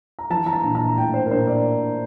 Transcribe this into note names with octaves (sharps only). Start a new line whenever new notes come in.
A#5
E3 A5
A#5
A5
A#1
A#5
A2 G5
C5
A#4
A#1 C5
D5